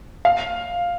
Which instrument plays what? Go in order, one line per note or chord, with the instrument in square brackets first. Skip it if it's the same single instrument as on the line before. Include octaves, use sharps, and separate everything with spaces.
[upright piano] F5